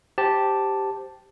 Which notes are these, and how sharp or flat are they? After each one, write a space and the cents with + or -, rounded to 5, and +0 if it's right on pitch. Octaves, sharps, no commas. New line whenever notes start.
G4 +0 C5 -5 A5 +0